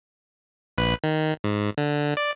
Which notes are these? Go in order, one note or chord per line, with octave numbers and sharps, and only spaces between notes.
A#1 B4 F#6
D#3
G#2
D3
D5